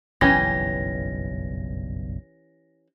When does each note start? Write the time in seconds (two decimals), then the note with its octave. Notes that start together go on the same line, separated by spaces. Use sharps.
0.21 F#1 B1 G2 E3 C#4 G4 A#6